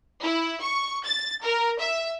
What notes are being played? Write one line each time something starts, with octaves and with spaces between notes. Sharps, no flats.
E4
C#6
A6
A#4
E5